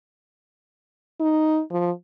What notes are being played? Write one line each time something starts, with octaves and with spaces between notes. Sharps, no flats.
D#4
F3